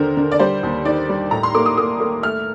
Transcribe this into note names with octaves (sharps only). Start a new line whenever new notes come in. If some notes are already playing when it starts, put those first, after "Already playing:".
Already playing: D#2 D3 A#4 C5
D3
D5
G3 C5
D#2
D#3 D5
G3
A2 A#5
C6
A#3 D6
D#6
A#3 D#6
A#3
A3 F6